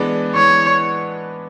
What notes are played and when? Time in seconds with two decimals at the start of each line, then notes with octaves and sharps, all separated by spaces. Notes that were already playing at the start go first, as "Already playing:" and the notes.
Already playing: E3 G#3 B3 D4
0.36 E3 C#5